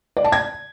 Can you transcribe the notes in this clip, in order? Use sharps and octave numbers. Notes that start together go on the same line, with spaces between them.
D5
A5
G#6